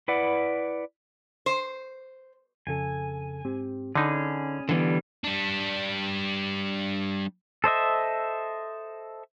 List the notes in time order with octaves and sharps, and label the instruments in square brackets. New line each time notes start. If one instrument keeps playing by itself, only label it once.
[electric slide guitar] E4 B4 D5 F#5
[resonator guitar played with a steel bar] C5
[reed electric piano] F2 C#3 A4 [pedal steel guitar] G#5
[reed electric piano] G#2 C4 G4
[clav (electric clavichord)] D3 D#4 [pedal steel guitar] C#4 G#4 [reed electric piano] D5 B5
[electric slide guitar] D3 E3 B3 [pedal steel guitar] G3
[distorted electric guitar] G3 D4
[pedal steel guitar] A4 C5 D#5 E5